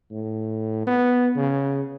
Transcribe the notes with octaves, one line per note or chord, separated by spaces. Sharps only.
A2
B3
C#3